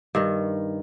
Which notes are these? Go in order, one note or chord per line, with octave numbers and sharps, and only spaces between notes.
G2 D#3